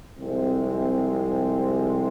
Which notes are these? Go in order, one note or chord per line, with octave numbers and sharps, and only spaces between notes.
C2 C3 F3 G#3 C4